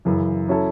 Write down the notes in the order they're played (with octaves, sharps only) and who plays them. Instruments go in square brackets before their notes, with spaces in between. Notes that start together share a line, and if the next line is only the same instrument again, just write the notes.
[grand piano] F#2 C#3 E3
F#3 C#4 E4 A4